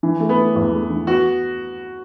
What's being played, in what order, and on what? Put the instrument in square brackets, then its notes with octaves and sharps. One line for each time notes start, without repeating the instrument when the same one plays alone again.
[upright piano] E3
A3
[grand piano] B3
[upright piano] A3
E2
A3
E3
[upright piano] B3 [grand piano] F#4